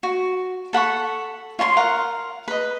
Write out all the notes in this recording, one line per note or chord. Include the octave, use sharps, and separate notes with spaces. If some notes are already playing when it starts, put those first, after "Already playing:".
F#4
A4 F#5 B5 C#6
F4 C#5 A5 C6
A#4 F5 F#5
B4 D#5